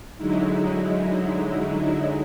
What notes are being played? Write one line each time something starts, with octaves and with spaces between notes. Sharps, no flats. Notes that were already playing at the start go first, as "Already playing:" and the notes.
D3 F#3 G#3 D#4 E4